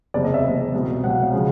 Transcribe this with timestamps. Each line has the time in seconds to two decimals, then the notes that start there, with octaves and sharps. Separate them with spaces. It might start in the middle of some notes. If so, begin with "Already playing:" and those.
0.14 F#1 E2 C3 D5
0.24 D#5
0.34 E5
0.43 F#1 E2 C3
0.74 C2 B2 F#3
1.04 C2 B2 F#3 F#5
1.13 F5
1.23 F5
1.32 C#3 F3 G#3